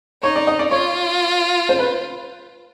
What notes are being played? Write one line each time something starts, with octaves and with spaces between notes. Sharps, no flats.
D#4 C#5
D5
D#5
D5
F4 C#5
C5
B4